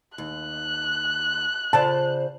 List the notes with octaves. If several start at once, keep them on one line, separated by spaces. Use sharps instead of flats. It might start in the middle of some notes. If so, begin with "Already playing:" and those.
D#2 F#6
C#3 F4 C5 D5 A5